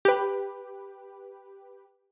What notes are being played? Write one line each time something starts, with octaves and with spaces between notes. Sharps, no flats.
G4 B4